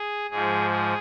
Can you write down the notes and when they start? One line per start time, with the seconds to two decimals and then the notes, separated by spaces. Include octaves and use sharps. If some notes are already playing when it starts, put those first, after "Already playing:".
Already playing: G#4
0.31 G#2 F3 G#4
0.70 G#4